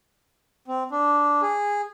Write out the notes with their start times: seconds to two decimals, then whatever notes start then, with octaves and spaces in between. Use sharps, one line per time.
0.68 C4
0.91 D4
1.42 G#4